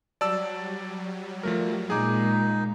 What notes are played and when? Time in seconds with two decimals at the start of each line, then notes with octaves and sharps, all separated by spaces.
0.21 F#3 G3 D5 A5 E6
1.43 F3 A3 A#4
1.90 A#2 G#3 D#4 G#4 D6